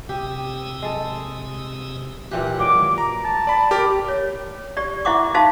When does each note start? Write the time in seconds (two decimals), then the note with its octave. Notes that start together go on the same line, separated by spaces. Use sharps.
0.09 C3 G4 D#6 E6
0.82 G#3 A4
2.31 A#2 E3 G4 F#6
2.59 D#3 F#3 G#3 D6
2.98 A#5
3.24 A5
3.47 D5 B5
3.71 G4 A#4 D6
4.08 C#5
4.77 G4 D5
5.05 E4 C5 E5 F#5 C#6 D6
5.34 D#4 F#4 C5 E5 F5 A5